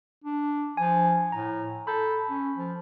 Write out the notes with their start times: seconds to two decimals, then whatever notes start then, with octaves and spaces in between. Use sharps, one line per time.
0.24 D4
0.77 F3 G#5
1.32 A2 A#5
1.87 A4 B5 G6
2.30 C#4
2.56 F3